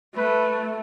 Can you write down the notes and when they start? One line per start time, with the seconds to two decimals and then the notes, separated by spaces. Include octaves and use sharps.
0.16 A3 B4